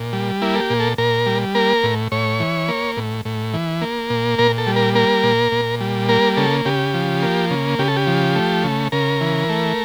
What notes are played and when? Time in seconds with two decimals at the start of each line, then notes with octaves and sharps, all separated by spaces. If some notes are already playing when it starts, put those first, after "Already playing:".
Already playing: A#2
0.13 G3
0.42 A#3 E4
0.55 A4
0.60 G4
0.70 A#2
0.80 A4
0.98 A#2 A#4
1.26 G3
1.55 A#3 A#4
1.84 A2
2.12 A2 C#5
2.40 E3
2.68 A#3
2.97 A2
3.25 A2
3.54 E3
3.82 A#3
4.10 A#2
4.39 A#2 A#4
4.58 A4
4.67 G3
4.76 A#4
4.95 A#3 A#4
5.23 A#2
5.52 A#2
5.81 G3
6.09 A#3 A#4
6.37 C#3 A4
6.65 C#3 G4
6.94 F3
7.22 A#3
7.51 C#3
7.79 C#3 G4
7.88 A4
7.96 G4
8.07 F3
8.36 A3
8.64 C#3
8.92 C#3 A#4
9.21 E3
9.49 A3